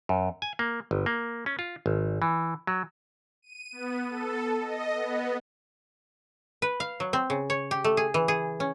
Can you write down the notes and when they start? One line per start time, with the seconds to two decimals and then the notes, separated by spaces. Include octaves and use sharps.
0.09 F#2
0.42 G#5
0.59 A#3
0.91 G1
1.06 A#3
1.46 C#4
1.59 F4
1.86 G#1
2.22 E3
2.67 F#3
3.42 D#7
3.72 B3
4.08 A4
4.61 D#5
4.94 B3
6.62 B4
6.80 F5
7.00 F#3
7.13 C4
7.30 C#3
7.50 C#5
7.71 G4
7.84 A3
7.97 G#4
8.14 E3
8.28 G#4
8.60 C#4